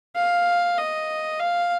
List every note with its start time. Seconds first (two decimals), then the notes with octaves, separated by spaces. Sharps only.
0.16 F5
0.78 D#5
1.40 F5